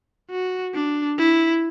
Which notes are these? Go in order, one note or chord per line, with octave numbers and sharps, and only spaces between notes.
F#4
D4
E4